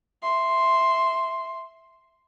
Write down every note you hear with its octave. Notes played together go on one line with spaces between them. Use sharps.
E5 C6